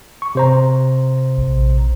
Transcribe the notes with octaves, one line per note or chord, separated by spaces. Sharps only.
C#6
C3 C5 A#5
A#1